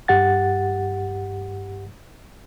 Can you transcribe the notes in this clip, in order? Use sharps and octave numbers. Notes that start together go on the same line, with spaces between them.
G2 G4 F#5 A6